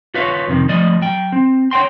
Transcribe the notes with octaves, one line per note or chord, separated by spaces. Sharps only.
F4 F#4 B4 C#5 E5 F5
F2 C3 D#3
F3 A3 D5 D#5
F#3 G5
C4
C#5 F#5 G5 C6